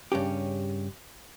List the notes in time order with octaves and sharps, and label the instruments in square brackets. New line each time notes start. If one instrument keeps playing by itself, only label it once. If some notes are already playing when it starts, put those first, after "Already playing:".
[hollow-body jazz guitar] G2 C#3 C#4 G4